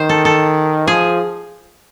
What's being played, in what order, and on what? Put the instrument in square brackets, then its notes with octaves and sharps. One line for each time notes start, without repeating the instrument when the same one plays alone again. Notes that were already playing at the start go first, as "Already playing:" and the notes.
Already playing: [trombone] D#3 [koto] C5
[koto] A4
A4
[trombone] F3 [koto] G#4